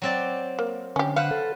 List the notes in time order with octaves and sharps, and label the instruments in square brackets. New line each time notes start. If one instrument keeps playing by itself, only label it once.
[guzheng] F#3 C4 D5
[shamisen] A#3
[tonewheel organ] D3 [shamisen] C#4 G4
[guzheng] B4 C5 F#5 [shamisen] F5
[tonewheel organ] A4